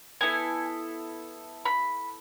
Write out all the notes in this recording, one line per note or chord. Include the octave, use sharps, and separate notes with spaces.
B3 E4 A4 G#5
B5